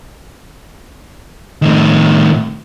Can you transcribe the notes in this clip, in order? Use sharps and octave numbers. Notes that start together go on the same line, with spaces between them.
A2 D#3